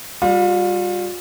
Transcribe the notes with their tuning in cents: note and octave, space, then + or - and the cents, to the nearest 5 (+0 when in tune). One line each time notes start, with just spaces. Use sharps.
G3 +5 F4 +40